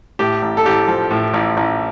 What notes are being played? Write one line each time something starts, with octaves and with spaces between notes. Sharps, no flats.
A2 G4
A1
A4
A1 G4
F3
A2
A1
A1